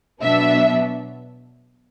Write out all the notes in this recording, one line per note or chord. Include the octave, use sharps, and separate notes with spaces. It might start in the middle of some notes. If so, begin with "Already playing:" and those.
B2 F#3 B3 D4 E5